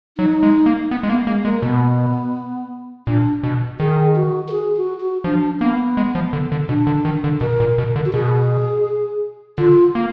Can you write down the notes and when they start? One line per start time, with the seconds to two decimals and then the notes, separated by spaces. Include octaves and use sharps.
0.18 F#3 D#4
0.43 G#3
0.66 A#3
0.91 B3
1.03 G#3
1.09 A#3 B3
1.26 G#3 A#3
1.44 G#3 A#3
1.62 B2 B3
3.07 A#2 D4
3.43 B2
3.80 D#3 G#4
4.16 F#4
4.48 A#4
4.52 G#4
4.77 F#4
5.01 F#4
5.24 F3 D4
5.60 A#3 B3
5.97 G#3
6.15 F3
6.33 D3
6.52 D3
6.69 B2 D4
6.87 D3
7.05 D#3
7.24 D3
7.41 B2 A#4
7.60 A#2
7.78 B2
7.96 D3
8.05 F#4
8.13 B2 G#4
9.58 D3 F4
9.95 A#3